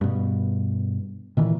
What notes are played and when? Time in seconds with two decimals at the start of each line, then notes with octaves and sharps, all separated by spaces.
0.01 G2 B2
1.37 A#2 D#3 E3